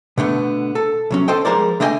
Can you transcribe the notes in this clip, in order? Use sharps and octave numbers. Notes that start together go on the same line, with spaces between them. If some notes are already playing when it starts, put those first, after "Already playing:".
B2 D3 A3 B3
A4
C2 F#3 C#4
A4 C5 D#5 G5
F3 G3 G#3 A#4 C5 D5
D3 A3 B3 D#5 G5 G#5